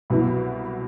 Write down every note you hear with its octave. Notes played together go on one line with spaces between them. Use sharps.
C2 B2 F#3 B3 E4